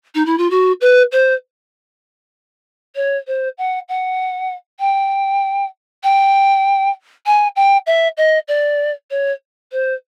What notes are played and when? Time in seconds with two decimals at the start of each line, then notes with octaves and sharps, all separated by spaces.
0.15 D#4
0.25 E4
0.38 F4
0.50 F#4
0.81 B4
1.12 C5
2.95 C#5
3.27 C5
3.58 F#5
3.88 F#5
4.79 G5
6.03 G5
7.26 G#5
7.56 G5
7.86 E5
8.17 D#5
8.48 D5
9.10 C#5
9.72 C5